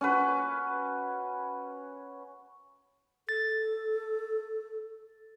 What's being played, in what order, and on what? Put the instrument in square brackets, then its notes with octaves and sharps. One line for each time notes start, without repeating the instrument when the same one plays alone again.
[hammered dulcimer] C#4 F#4 B4
[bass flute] A4 [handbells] A6